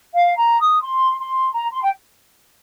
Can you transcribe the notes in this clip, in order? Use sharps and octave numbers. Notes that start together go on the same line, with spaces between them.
F5
A#5
D#6
C6
C6
A#5
C6
G5